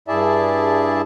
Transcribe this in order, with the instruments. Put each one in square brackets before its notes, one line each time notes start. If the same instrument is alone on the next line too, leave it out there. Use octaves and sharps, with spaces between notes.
[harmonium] G2 E4 G#4 D5 E5 A5